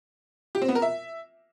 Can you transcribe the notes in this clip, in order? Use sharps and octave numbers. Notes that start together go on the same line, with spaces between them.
G4
C4
B3
A#4
E5